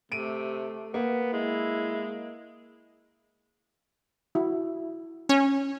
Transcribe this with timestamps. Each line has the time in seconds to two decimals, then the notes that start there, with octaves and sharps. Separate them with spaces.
0.12 C3 A3 D7 D#7
0.94 A#3 B3
1.33 G#3 E4
4.35 E4 F#4
5.29 C#4